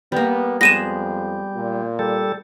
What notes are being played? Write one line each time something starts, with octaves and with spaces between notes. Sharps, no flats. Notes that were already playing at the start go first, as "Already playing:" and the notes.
G3 A#3 B3
F2 G3 G#3 B3 G#4 A#6 D#7 E7
A#2
G3 A4